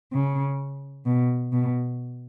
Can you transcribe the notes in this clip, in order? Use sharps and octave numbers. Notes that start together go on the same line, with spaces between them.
C#3
B2
B2